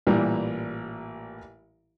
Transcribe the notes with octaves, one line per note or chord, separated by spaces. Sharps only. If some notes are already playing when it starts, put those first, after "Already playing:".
A1 A#2 E3 G3 A#4